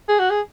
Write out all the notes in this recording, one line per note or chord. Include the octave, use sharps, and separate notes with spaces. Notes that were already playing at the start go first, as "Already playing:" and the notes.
G#4
F#4
G#4